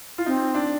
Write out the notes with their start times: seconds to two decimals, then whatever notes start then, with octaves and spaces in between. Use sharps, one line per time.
0.18 F4
0.26 C4 D#4
0.55 D4